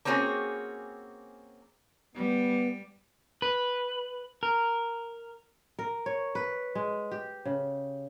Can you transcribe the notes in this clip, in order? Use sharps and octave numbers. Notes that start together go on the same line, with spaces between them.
A#3 C4 C#4 F#4 G#4
G3 B3
B4
A#4
A#4
C#5
B4
G#3
G4
C#3